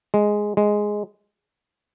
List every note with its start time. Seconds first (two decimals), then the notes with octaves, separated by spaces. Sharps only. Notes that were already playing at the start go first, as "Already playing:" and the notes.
0.14 G#3
0.57 G#3